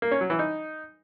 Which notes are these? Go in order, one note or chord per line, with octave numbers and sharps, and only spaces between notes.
A#3
C#4
F#3
E3
D#4